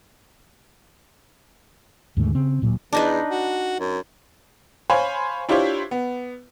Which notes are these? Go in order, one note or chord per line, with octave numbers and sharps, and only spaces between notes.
D#2 G#2 D3 A3
C#3 C4
D1 A#2 F#3
E2 D4 D#4 B4
F#4
F#2
C5 C#5 F5 G#5 B5
D4 E4 F4 G4 C5 C#5
B3